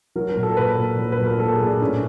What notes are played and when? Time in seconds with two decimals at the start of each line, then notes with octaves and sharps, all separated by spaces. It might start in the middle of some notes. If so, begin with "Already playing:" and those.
0.16 F#3 A#4
0.29 A#4
0.36 A#2
0.43 A4
0.57 A#2 B4
0.77 A#2
0.99 F#3
1.12 B4
1.19 A#2
1.26 A#4
1.39 F#3 A4
1.53 G#4
1.60 A#2
1.67 D4
1.81 A2 C#4